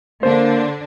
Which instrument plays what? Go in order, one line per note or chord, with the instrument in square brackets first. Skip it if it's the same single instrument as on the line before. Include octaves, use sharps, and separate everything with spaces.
[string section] D3 D4 [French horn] A#3 [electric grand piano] C5